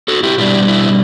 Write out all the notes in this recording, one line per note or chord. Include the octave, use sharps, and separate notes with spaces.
F#4 A4
E4 G4
B2 G3 D4 E4 G4
E4